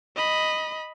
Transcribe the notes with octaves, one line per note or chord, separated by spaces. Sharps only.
D#5 B5